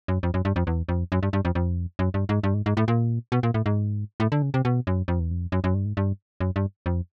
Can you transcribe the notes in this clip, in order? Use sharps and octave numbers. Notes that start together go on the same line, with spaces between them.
F#2
F2
F#2
G2
F2
E2
F2
F#2
G2
G2
F2
F2
F#2
G2
G#2
G2
G#2
G#2
A2
A#2
B2
A#2
A2
G#2
A2
D3
C#3
C3
B2
F#2
F2
E2
F2
F#2
F#2
G2
G#2
G2
F#2
G2
F2